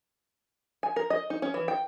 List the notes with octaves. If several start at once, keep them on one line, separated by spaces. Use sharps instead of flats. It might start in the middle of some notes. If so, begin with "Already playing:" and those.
G#5
A#4
D#5
D#4
C#4
E3
G5